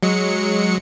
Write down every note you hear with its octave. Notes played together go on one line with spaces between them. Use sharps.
F#3 G#3 C#7